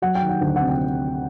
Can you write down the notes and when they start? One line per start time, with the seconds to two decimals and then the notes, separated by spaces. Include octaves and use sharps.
0.02 F#3 F#5
0.15 G5
0.22 D#3
0.29 F#5
0.41 D2 G5
0.56 C3 F#5
0.69 G5